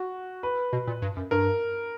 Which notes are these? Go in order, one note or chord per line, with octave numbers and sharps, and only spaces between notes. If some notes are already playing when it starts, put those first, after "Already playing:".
Already playing: F#4
B4
B2
A#2
G2
F#2
G2 A#4